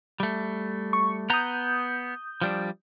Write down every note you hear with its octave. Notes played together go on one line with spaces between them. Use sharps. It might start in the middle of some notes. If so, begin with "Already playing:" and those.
G3 A3
C#6
B3 A#5 D#6 G6
F3 G3 D4